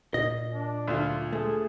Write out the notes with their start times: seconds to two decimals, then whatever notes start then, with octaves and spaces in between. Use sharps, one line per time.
0.14 A#2 D#5
0.53 D4
0.88 D2 F4
1.33 A3 G#4